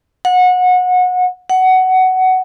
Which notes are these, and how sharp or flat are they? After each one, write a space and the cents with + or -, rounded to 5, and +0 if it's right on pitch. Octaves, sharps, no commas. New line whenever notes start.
F#5 -25
F#5 +15